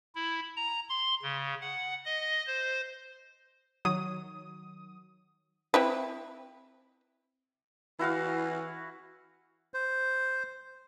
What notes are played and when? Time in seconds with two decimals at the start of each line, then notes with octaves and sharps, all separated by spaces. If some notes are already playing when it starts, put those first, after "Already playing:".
0.15 E4
0.56 A#5
0.89 C6
1.22 C#3
1.62 F#5
2.06 D#5
2.47 C5
3.85 D#3 F#3 D#6
5.74 C4 E4 B4
7.99 E3 E4 F#4 F5
9.74 C5